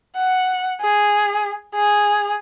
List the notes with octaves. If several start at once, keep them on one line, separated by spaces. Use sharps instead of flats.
F#5
G#4
G#4